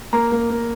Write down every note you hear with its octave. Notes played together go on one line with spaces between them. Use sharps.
A#3 A#5
A#3
A#3